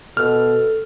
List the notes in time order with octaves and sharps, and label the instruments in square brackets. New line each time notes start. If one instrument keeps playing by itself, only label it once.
[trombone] B2 [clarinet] A4 [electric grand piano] F6